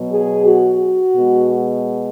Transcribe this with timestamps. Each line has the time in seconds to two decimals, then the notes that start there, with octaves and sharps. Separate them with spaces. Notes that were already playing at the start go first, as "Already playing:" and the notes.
Already playing: B2 F#3
0.11 G#4
0.46 F#4
1.15 B2 G#3